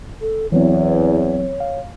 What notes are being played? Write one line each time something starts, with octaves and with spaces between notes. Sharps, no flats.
A4
E2 E3 F#3 C4 C#5
F5